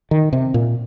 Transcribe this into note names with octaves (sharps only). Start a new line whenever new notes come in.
D#3
C3
A#2